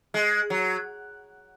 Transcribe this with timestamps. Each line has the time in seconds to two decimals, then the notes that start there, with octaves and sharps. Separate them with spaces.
0.14 G#3
0.50 F#3